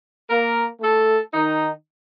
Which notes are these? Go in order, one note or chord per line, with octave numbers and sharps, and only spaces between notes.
A#3 A#4
A3 A4
D#3 D#4